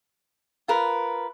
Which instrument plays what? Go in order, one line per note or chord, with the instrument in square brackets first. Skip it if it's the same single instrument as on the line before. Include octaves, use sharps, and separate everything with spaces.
[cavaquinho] F4 A#4 B4